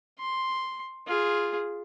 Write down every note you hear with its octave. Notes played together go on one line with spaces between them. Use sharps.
C6
F4 G#4